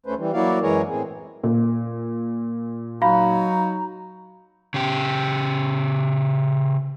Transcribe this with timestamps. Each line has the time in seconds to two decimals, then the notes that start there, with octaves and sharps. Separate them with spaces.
0.06 D2 A3 C#4 B4 C5
0.18 E3 G3
0.33 F#3 A#3 E4 F#4 D5 F5
0.62 F#2 E3 G#3 G#4 A#4 C#5
0.89 A2 C4 G#4
1.44 A#2
3.02 F#3 D#4 F#4 F5 A#5 B5
4.74 C#3 G4